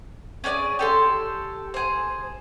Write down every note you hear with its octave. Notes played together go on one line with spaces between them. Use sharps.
C#4 G#4 A#4 D5
G4 A4 C6
G#4 C5